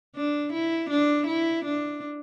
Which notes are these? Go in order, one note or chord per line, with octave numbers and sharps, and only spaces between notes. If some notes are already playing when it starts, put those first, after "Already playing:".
D4
E4
D4
E4
D4